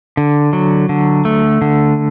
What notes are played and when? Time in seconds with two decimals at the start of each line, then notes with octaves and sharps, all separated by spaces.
0.17 D3
0.53 F#3
0.89 D3
1.25 A3
1.62 D3